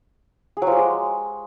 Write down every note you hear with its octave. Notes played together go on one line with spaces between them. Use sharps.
G#4
F#3
F3
G4
G#3